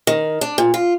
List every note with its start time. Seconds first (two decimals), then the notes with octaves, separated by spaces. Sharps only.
0.07 D#3
0.41 D4
0.58 A#2
0.74 F4